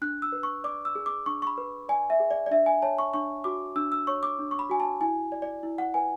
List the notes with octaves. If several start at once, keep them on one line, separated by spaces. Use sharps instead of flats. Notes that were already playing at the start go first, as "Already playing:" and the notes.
D4 F#6
E6
B4
C#6
D5 D6
E6
G#4
D6
D4 C#6
C#6
B5
B4
D5 G#5
E5
G#4
D5
D5
D4 E5
G#5
C#5 A5
C#6
D4 C#6
F#4 D6
D4 E6
E6
C#5 C#6
D6
D4
C#6
B5
F#4 G#5
A5
E4 G#5
D5
D5
E4
F#5
B4 G#5